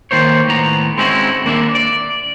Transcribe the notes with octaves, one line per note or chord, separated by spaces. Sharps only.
D#3 A#3 C5 C#5
A2 D#3 B3 A#5
G#3 C4 C#4 D#4 E4 F#4
D#2 A#3 D4 E5
D5